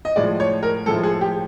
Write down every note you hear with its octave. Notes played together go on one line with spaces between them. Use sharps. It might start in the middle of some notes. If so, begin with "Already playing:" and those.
D#5
A2 F3 G#3 D5
C#5
A#4
A2 F3 G#3 A4
G#4
G4